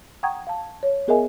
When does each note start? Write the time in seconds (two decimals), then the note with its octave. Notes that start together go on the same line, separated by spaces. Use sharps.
0.23 F#5 G5 A#5 C#6 D#6 G#6
0.47 F5 A5
0.83 C#5
1.08 B3 G#4 A#4 D#5 E5 G#5